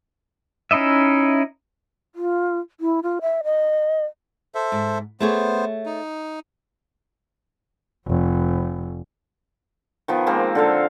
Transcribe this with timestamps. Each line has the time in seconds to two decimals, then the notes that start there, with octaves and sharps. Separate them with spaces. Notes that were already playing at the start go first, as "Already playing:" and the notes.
0.71 C#4 D#4 E4 D#5 E5
2.15 F4
2.80 E4
3.03 F4
3.21 E5
3.44 D#5
4.55 A4 C5 E5
4.72 G#2
5.20 A3 B3 G#4 C5 C#5
5.86 D#4
8.06 F1
10.08 D#3 F3 B3
10.26 G#3 A#3 C4
10.55 D3 A4 F5